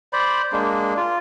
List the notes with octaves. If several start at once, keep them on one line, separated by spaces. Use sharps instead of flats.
C5 D5 B5
G#3 A#3 D4
F4